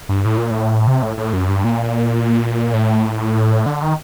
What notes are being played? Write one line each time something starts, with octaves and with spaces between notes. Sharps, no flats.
G2
A2
A#2
A2
C3
A2
A2
F#2
G2
A#2
A2
D3
D#3